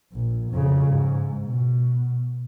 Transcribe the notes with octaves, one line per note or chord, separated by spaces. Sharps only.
A#1
F2 C#3
G#2
B2